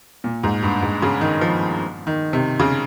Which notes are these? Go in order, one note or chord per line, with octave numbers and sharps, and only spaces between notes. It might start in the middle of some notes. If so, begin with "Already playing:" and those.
A#2
G#2
G2
G#2
C#3
D#3
F3
D#3
C3
C#3